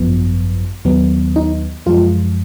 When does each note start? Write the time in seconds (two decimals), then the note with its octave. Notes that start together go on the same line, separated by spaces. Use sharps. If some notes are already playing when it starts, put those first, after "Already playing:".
Already playing: G#1 F#2 F3 B3
0.85 D#2 D#3 F#3 B3
1.36 D#4
1.86 F#2 F3 G#3 F4